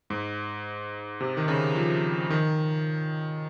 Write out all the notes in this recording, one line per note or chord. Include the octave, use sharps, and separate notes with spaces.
G#2
C3
D#3
C#3
F3
D#3